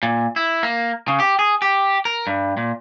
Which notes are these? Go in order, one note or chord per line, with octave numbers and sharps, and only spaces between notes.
A#2
E4
A#3
C#3
G4
G#4
G4
A#4
G2
A#2